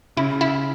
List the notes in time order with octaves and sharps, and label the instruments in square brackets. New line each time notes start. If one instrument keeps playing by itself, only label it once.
[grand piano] C#3 [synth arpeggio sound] E4
[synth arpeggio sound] E4